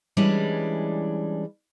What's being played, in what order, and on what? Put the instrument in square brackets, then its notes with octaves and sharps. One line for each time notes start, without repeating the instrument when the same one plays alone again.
[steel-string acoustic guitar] E3 G3 G#3 C#4 D4